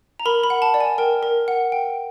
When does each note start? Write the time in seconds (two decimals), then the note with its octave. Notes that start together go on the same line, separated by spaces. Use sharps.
0.20 A#5
0.26 A#4 B5
0.44 B5
0.50 F#5
0.62 A5
0.74 D5
0.81 G#5
0.98 A#4 G5
1.23 A#4
1.48 F#5
1.72 G5